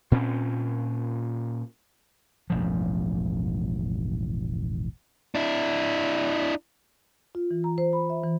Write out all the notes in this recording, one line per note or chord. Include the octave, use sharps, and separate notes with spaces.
A#2 C4 C#4
E1 A1 G2 F3
D4 E4
F4
E3
A#5
C5
B5
E5
E3